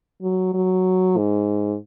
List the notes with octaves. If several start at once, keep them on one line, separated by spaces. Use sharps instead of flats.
F#3
F#3
G#2